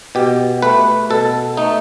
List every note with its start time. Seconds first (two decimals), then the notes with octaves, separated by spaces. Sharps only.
0.15 B2 G4
0.62 A3 B4
1.10 B2 A4
1.57 A3 D#4